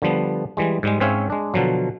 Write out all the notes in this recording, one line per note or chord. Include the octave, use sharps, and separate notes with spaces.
D3 F3 G3 B3
E3 G3 G#3
G#2 G3 G#3
G#2 C4 C#4 C#5 E5 F5
G#3 D4
B2 D3 F3 F#3